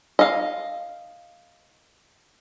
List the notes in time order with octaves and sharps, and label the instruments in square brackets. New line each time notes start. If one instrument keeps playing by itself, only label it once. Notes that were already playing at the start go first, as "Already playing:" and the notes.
[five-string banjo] D#5 F5